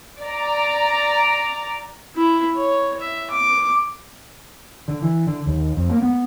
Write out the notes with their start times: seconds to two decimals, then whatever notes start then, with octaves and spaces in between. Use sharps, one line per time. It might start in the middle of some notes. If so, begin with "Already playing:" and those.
0.22 D5 A#5
2.15 E4
2.55 C#5
3.00 E5
3.30 D6
4.88 D3
5.02 E3
5.27 D3
5.46 D#2
5.76 F2
5.90 A#3
6.02 B3